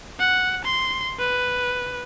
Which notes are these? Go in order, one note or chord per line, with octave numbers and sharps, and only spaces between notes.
F#5
C6
B4